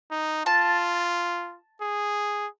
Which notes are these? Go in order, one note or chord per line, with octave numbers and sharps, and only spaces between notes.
D#4
F4 A5
G#4